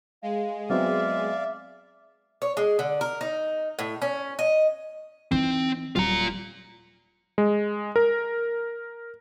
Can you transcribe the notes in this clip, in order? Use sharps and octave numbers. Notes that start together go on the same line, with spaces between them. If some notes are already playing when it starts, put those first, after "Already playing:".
G#3 F5
F#3 B3 C4 D5 E5 F5
C#5
G#3
D3
A#4
D#4
A2
C#4
D#5
E3 C4 D#4
D#1 F#3 F4 A#5
G#3
A#4